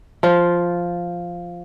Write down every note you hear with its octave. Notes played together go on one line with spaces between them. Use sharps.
F3 F4